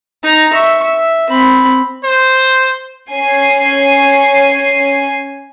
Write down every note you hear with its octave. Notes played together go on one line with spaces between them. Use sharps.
D#4 A#5
E5 C#6
E5
C4 B5
C5
C#4 G#5 C7